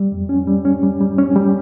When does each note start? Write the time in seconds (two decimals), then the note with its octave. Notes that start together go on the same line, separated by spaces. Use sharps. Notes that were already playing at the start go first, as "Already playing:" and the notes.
Already playing: G3
0.12 F2
0.29 C#4
0.47 G3
0.65 C#4
0.83 G3
1.01 G3
1.18 C#4
1.36 G3